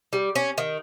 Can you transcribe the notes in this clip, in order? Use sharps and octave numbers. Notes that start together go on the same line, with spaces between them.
G3
C#4
D#3